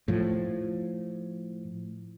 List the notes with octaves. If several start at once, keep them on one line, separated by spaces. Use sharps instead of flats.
A2 F3